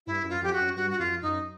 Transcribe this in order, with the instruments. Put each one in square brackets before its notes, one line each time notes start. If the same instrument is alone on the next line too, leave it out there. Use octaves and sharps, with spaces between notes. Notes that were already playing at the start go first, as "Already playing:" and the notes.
[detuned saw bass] G2 [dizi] E4
[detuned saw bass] F#2
[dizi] F4
[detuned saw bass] F2 [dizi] G4
[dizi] F#4
[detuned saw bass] F#2
[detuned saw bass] G2 [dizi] F#4
[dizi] F#4
[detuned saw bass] F2 [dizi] F4
[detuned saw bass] F#2 [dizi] D#4